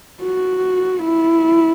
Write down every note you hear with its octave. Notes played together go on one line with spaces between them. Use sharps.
F#4
E4